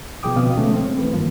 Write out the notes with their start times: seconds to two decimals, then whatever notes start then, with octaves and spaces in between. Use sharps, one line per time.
0.23 B2 F3 G#4 G5 D6 D#6
0.36 D2 B2 D3 C4 F5 D#6
0.55 B2 D3 F3 G#3 A3 C#4
0.74 C4
0.98 E3 A3 B4
1.13 G2 D#3 F3 A#3 F4